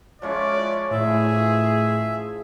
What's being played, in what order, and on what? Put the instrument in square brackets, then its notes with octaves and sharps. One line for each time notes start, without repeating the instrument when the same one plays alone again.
[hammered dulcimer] F3 G#3 C#4 [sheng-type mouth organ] E4 [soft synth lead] C#5 [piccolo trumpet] D5
[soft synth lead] A2 [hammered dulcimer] E3 F3 [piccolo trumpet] G#4 [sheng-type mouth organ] E5